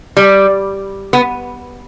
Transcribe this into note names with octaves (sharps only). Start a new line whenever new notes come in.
G3
B3